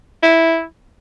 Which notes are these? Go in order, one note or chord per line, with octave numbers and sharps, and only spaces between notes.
E4